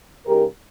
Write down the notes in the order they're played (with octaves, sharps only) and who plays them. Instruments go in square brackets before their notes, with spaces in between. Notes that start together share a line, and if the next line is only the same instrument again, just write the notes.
[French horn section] C#3 G#3 D#4 G4 A#4